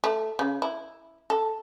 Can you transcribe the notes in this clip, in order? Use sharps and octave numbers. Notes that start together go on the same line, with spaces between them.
A3
C#3
E4
A4